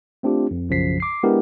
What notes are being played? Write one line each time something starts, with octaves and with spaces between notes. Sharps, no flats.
A3 C4 D4 F4 G4
F2
B1 F#2 C#3 F3 B6 C7
D6 C7
G#3 B3 D4 E4 G4 A#4